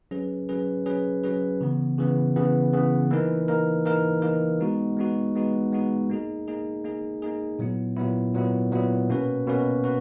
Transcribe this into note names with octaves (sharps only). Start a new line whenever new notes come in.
F#3 C#4 G#4 B4
F#3 C#4 G#4 B4
F#3 C#4 G#4 B4
F#3 C#4 G#4 B4
C#3 E3 B3
C#3 E3 B3
C#3 E3 B3
C#3 E3 B3
E3 A#3 D#4 A#4
E3 A#3 D#4 A#4
E3 A#3 D#4 A#4
E3 A#3 D#4 A#4
G#3 B3 D#4 F#4
G#3 B3 D#4 F#4
G#3 B3 D#4 F#4
G#3 B3 D#4 F#4
A#3 D#4 G#4
A#3 D#4 G#4
A#3 D#4 G#4
A#3 D#4 G#4
A#2 F#3 B3 E4
A#2 F#3 B3 E4
A#2 F#3 B3 E4
A#2 F#3 B3 E4
B2 A#3 C#4 F#4 B4
B2 A#3 C#4 F#4 B4
F#4 B4